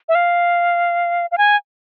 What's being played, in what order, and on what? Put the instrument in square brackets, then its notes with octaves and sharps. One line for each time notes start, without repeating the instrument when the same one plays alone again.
[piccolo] E5
F5
F5
G#5